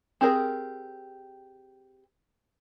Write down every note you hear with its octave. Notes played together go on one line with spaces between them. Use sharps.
C4 G4 G#4 A#4